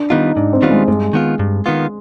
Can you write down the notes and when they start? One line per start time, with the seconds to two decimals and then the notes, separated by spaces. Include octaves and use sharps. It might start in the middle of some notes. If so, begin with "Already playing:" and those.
Already playing: D4
0.10 D#3 G3 B3 D#4 F4
0.36 G#2 D4
0.53 C4
0.62 D#3 G3 B3 F4
0.71 G#3
0.88 G2 G#3
1.13 D#3 B3 F4
1.39 G2
1.66 D#3 B3 F4